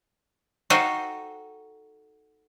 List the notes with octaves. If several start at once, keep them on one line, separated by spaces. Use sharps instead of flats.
D#4 F#4 A4 F5 G5